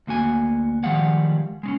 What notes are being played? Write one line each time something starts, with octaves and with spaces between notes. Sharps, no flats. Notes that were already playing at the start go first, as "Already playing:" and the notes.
D2 A#3 F#4 G#5
D#3 F3 G3 G#3 F5 F#5
G#3 C4 C#4